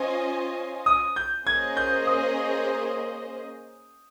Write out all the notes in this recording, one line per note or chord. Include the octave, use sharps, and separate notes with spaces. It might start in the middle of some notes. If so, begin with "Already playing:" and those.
Already playing: C#4 F4 C5 D#5 G#5
D#6
G6
A#3 C#4 G#4 C5 D#5 G#6
G6
D#6